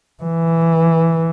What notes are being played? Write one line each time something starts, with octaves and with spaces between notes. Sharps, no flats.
E3